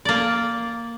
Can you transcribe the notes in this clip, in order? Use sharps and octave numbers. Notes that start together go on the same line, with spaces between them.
A#3 D5